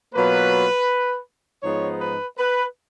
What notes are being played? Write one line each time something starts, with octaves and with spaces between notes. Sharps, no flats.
B2 F#3 A#3 F4 B4
G#2 F3 B3 D#4 C#5
B4
B4